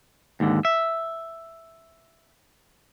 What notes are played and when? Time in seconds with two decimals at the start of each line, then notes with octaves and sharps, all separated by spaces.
0.40 D#2 G#2 D3
0.65 E5